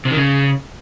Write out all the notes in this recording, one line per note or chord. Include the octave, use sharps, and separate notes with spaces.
C3
D#3
C#3